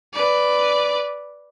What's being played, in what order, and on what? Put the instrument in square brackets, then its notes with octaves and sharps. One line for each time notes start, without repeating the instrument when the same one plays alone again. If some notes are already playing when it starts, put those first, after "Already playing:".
[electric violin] B4 D5